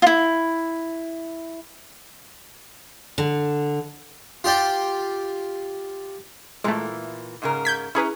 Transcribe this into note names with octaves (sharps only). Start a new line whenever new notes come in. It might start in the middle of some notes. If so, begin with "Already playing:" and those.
E4 F4
D3
F4 G4 D5 G5
A#2 E3 G#3 A3
G#2 C#3 A#4
G6 G#6 B6
C#4 E4 G#4 B4 A#5